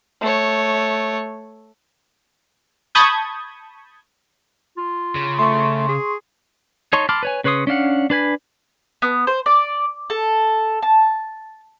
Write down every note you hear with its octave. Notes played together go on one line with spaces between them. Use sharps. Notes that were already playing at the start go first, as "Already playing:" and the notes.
A3 C#5
A5 B5 C#6 D#6 G6 G#6
F4
C#3
A3 C6 C#6
G#4
D#4 C#5 A5 C6 C#6
A5 B5 C6 D6 F6
B4 C#5 G#5
C#3 B4 C#5 C6 D#6
C#4 D4 F5 F#5
D4 B4 G#5 B5
B3
C5
D5
A4
A5